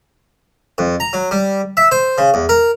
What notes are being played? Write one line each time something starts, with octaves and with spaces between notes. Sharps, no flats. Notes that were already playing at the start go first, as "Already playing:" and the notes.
F2
A#5
F#3
G3
E5
C5
C#3
E2
A#4